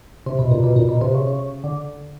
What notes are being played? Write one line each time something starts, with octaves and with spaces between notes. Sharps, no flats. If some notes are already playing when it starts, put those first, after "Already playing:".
C3
B2
A#2
B2
A#2
B2
C3
C#3
C#3
D3